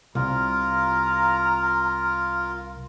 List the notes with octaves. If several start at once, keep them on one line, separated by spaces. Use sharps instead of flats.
C2 F4 A#4 A#5